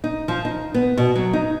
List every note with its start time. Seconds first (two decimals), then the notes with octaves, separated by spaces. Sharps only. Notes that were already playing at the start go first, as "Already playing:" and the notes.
0.04 D#4
0.28 F3
0.45 D#4
0.74 B3
0.98 B2
1.16 F#3
1.33 D#4